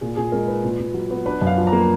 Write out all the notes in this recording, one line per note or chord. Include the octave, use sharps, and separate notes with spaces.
A#2 G#4
A#2 G#4
G#3 A#4
D#4 B4
A#2
A#2
F#3
B3
D4 B4
F#2
F5
F3
A#5
A#3